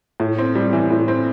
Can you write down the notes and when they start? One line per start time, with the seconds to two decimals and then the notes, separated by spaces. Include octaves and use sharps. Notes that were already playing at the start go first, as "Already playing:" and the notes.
0.20 A2
0.38 C4
0.55 G3
0.73 E3
0.91 A2
1.08 C4